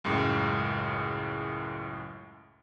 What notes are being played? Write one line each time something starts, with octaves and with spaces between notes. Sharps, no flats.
C#2 F#2 A2 G#3